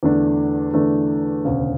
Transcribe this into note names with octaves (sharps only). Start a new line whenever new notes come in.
E2 D3 A3 D4
E2 D3 A3 D4
E1 D2 C#3